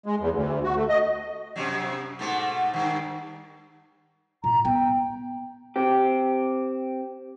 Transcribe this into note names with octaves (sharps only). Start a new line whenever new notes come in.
G#3
E2
D2
F#4
A3
D#5
F#2 C3 F#3
G#2 B2 A3
G2 D#3
A#2 A#5
B3 G5
C4 G4